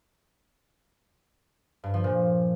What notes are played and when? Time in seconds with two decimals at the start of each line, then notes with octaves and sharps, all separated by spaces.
1.84 G2
1.94 F3
2.04 A#2